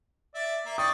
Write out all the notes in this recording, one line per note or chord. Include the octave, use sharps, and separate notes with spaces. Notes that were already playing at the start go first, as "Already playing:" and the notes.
D5 E5
A#3 E5
D5 G5 C#6 D#6